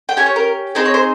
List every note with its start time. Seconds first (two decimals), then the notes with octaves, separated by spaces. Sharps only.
0.09 G5
0.17 C#4 G4 G#5
0.26 C#5
0.36 A#4
0.75 C4 D#4 G#4 C5
0.85 C#5
0.94 C5